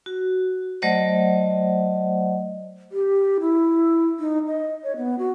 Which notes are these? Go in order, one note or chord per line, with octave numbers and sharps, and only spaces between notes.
F#4
F#3 A3 C5 D5 D#5 F#5
G4
E4
D#4
D#5
C#5
B3
F#4